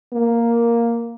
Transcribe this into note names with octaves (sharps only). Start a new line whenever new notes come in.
A#3